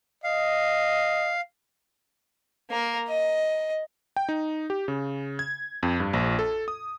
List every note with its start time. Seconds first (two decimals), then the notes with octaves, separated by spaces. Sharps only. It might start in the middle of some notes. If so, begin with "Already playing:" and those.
0.24 D#5 F5
2.70 A#3 A#4
3.08 D#5
4.16 G5
4.29 D#4
4.70 G4
4.88 C#3
5.39 G#6
5.83 F2
6.00 G2
6.13 A#1
6.39 A4
6.68 D#6